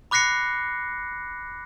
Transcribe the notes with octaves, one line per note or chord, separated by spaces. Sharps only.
B5 D6 F#6 A#6 C7 C#7